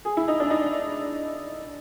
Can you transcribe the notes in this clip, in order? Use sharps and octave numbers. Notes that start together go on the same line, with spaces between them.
G#4
E4
D#4
D4
D#4